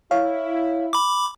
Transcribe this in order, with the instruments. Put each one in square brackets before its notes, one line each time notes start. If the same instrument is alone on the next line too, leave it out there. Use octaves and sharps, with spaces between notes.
[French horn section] E4 [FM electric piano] C#5 F5
[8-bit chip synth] B5 D6